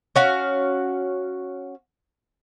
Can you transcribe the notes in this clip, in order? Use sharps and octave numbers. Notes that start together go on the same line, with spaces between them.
C#4 F#4 F5